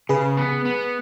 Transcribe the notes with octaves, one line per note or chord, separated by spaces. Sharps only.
C#3 G#4 B4
B3
B3